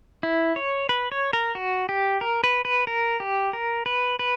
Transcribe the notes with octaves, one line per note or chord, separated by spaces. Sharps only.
E4
C#5
B4
C#5
A#4
F#4
G4
A#4
B4
B4
A#4
G4
A#4
B4
B4